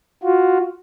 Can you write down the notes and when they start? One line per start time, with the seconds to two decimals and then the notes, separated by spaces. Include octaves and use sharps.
0.23 F4 F#4